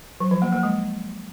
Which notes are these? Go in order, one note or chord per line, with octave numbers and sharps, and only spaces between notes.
F#3
F3
A#3
A#3
G#3